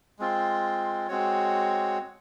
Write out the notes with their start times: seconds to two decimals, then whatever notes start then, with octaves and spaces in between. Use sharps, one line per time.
0.19 G#3 C4 F4
1.08 G#3 C4 F#4 C#5